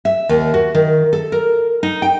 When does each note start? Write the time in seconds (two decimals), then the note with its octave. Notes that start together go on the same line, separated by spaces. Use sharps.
0.05 E5
0.29 D#2
0.54 F#4
0.75 D#3
1.13 A4
1.32 A#4
1.83 D#4
2.02 G5